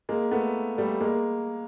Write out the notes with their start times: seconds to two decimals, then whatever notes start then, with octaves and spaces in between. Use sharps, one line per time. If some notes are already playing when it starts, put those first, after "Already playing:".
0.09 G#3 A#3
0.31 A3 B3
0.78 G3 A3
1.00 G#3 A#3